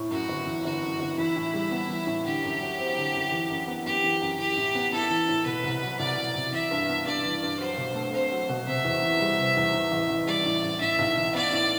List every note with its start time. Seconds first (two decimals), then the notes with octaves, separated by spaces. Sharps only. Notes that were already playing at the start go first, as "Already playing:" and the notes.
Already playing: A2
0.11 F#2 F#4
0.29 G1
0.46 E3
0.64 G1 F#4
0.83 F#2
1.00 G1
1.18 E3 E4
1.36 A2
1.54 G3
1.71 B3
1.89 E3
2.07 A2
2.25 D3 G4
2.43 F#2
2.61 F#3
2.78 C4
2.97 D3
3.14 F#2
3.32 E3
3.50 F#2
3.68 B3
3.85 F#2 G4
4.03 E3
4.21 F#2
4.39 E3 G4
4.57 A2
4.75 B3
4.92 E4 A4
5.10 E3
5.29 A2
5.46 B2 B4
5.64 C2
5.82 F#3
5.99 C2 D5
6.17 B2
6.36 C2
6.52 E3 E5
6.71 G2
6.89 B3
7.06 G2 D5
7.24 E3
7.43 G2
7.59 F#3 C5
7.78 B2
7.95 A3
8.13 C4 C5
8.32 F#3
8.49 B2
8.67 C3 E5
8.85 E2
9.02 E3
9.20 G3
9.39 C3
9.57 E2
9.74 A2
9.92 A1
10.10 E3
10.27 G3 D5
10.45 A2
10.63 A1
10.81 A2 E5
10.99 B1
11.16 E3
11.34 B3 D5
11.52 A2